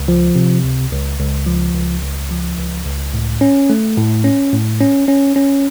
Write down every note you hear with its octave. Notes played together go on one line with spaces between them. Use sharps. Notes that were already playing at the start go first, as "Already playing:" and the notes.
Already playing: C#2
F3
C3
C#2
C#2
C#2
F3
C#2
C#2
F3
C#2
C#2
A2
C#4
A3
A2
C#4
A2
C#4
C#4
C#4